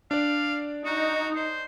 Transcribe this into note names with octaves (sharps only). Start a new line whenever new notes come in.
D4 D5 F5
D#4 F#4
C5